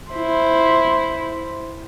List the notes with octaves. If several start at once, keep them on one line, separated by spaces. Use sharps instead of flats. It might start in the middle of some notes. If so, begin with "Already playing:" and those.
E4 C5